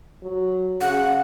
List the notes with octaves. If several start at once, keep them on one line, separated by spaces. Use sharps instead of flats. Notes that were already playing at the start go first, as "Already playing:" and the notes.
F#3
C#3 F#5